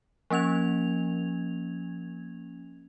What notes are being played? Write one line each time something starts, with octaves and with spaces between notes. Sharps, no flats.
F3 A#3 C#4 G#6 F7